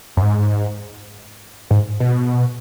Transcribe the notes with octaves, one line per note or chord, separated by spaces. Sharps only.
F#2
G#2
G#2
B2